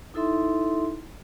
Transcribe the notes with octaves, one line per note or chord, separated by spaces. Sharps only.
D#4 E4 A4 E5 C6